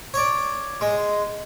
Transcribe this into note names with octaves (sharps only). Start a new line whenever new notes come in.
C#5 D5
G#3